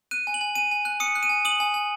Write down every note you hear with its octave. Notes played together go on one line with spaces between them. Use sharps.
F#6 D#7
G#5
F#7
G#5
G#5 D#7
G#5
F#6
D#6 C#7
F#6
D#7
G#5
D#6 F#7
G#5
G#5